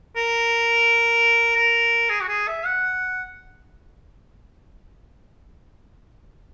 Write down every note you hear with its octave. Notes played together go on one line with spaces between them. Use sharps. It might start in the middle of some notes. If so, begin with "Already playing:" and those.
A#4
A#4
G#4
F#4
G#4
E5
F#5